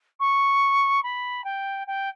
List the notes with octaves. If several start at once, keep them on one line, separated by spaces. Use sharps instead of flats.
C#6
B5
G5
G5